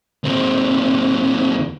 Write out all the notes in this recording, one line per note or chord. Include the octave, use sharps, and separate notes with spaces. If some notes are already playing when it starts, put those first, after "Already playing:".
D#2 C4